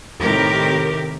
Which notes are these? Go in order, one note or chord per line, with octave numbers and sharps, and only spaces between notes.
A2 C3 D#3 G4 A#4